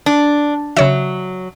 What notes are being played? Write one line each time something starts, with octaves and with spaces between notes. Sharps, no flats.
D4
C#3 F#3 C#5 E5